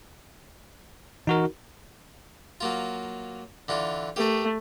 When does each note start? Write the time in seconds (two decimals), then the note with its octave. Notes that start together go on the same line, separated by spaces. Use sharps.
1.27 E3 D#4 F#4 A#4
2.61 F#3 A#3 F4
3.68 D3 E3 F4
4.16 A3 G4 A#4